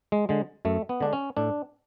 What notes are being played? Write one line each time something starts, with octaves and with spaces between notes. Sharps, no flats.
G#3
D3 G#3
F#2 A3
B3
D3 G#3 D4
C#4
A2 D4